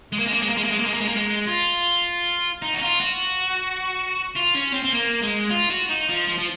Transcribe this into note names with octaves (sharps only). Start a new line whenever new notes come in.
G#3
A#3
G#3
A#3
G#3
A#3
G#3
A#3
G#3
A#3
G#3
A#3
G#3
A#3
G#3
F4
D#4
F#4
F4
F#4
F4
C#4
C4
C4
A#3
G#3
F4
F#4
D#4
F3
F3
F3